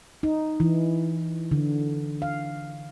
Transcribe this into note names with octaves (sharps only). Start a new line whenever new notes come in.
D#4
E3
D3
F5